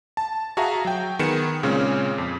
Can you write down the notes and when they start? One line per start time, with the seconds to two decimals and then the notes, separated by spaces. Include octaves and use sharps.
0.17 A5
0.57 F#4 G#4 E5 F5 A5 A#5
0.85 F#3 G5
1.19 D#3 B3 G#4 C#7 E7
1.63 A#2 C#3 G#3 C4 C#4
2.18 F2